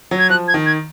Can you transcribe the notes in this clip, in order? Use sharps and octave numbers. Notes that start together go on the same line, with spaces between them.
F#3
G#6
F3 F#6
G#6
D#3
G#6